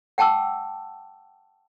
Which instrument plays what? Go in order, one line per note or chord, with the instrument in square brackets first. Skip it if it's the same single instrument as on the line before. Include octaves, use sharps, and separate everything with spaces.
[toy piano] F#5 G5 A5 D6 E6